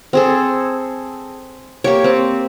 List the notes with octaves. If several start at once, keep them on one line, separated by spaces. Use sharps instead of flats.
C4 G#4 A4
A#3 G4 C#5
C4